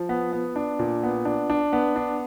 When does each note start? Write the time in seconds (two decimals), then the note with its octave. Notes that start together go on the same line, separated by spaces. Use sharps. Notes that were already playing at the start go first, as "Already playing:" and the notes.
Already playing: F3
0.09 B3
0.33 B3
0.56 D4
0.79 A#2
1.03 B3
1.25 D4
1.50 D4
1.73 B3
1.96 D4